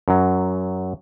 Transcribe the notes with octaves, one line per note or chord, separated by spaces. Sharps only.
F#2 F#3